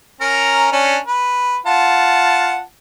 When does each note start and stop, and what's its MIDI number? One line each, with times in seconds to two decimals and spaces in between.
0.21 0.68 61
0.21 0.68 70
0.21 0.68 82
0.72 0.98 61
0.72 0.98 62
1.07 1.56 71
1.66 2.61 65
1.66 2.61 78
1.66 2.61 81